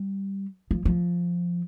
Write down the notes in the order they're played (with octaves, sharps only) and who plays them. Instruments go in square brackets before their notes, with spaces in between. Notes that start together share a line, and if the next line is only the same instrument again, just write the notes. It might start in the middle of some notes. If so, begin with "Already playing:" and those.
Already playing: [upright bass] G3
F3
F3